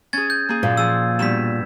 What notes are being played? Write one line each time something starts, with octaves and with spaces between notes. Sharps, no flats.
C#4 G#4 G#6 A6
G6
A#3 G#4
F#2 A#2
F3 G#4 E6
G2 B2 B6 E7